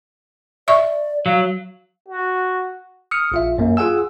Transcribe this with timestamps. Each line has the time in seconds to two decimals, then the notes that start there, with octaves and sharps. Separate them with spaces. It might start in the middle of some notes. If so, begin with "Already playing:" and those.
0.68 D5 E5 C#6
1.26 F#3 F5
2.08 F#4
3.11 D#6 F6 C#7
3.32 A#1 F4 E5
3.58 F#2 A#3
3.77 F4 G#4 F#5 G#5 E6